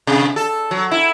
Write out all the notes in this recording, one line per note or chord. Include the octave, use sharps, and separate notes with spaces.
C3
A4
F#3
E4